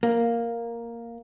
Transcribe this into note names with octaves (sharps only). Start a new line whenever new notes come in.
A#3